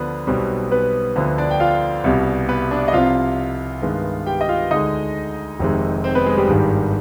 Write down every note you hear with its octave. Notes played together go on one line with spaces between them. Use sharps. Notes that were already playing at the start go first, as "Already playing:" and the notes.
Already playing: D2 D3 F3 B3 D4 B4
B1 B2 G3 C4
B3 B4
D2 D3 F3 B3
D4 D5
G5
F4 F5
C2 B2 G3
B3 B4
D4 D5
D#5
C2 C3 F3 F4 F5
G2 D#3 G#3 B3
G4 G5
D#5
F4 F5
D2 D3 G#3 D#4 D#5
F1 F2 C3 D#3 G#3
C4 C5
B3 B4
G#3 G#4
G3 G4
G#1 G2 D#3 G#3